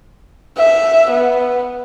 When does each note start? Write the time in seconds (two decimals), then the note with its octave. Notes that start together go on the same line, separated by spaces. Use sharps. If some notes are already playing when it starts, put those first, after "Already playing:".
0.58 E5
1.11 B3